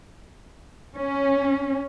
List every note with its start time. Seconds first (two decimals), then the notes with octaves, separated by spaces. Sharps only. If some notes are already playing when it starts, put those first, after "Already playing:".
0.96 C#4